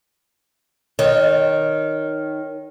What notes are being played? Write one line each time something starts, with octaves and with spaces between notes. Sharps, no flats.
D#3 C#5